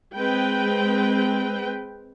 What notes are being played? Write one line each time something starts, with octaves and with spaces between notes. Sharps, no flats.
G#3 C4 B4 G5